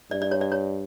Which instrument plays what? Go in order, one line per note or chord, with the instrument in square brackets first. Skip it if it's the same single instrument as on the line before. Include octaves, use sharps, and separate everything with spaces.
[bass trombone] G2 [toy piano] D5
[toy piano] D5
C#5
D5
C#5